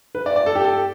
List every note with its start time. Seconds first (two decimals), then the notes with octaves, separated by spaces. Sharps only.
0.15 B4
0.26 D5
0.36 D5
0.46 A4
0.55 G4
0.65 A4